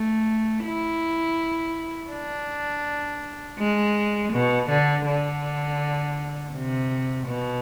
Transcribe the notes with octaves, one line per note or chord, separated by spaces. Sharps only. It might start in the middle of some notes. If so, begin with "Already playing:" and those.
Already playing: A3
E4
D4
G#3
B2
D3
D3
C3
B2